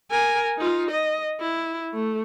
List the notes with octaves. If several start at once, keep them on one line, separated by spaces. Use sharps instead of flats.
A#4 G#5
D#4 F4
D#5
E4
A3